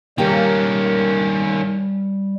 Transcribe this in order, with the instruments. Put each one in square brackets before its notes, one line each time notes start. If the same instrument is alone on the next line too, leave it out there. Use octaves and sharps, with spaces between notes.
[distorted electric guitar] D#3 C#4 [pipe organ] G3 [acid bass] A#3 [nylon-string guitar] G4 A#4 G5